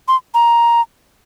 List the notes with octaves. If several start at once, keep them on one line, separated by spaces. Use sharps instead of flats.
C6
A#5